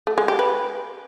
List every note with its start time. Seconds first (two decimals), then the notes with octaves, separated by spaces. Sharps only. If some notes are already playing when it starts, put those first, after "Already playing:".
0.07 A3
0.18 G#3
0.28 G4
0.39 B4